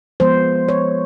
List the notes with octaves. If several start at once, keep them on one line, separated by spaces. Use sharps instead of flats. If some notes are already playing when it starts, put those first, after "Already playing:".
F3 G#3 B3 C5
C#5